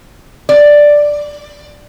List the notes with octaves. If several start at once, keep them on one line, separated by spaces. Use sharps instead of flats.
D5